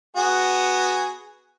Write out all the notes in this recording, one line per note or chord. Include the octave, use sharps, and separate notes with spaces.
B3 F#4 G#4